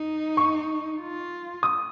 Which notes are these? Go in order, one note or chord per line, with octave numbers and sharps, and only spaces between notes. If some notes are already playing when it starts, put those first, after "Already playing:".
Already playing: D#4
C#6
F4
D#6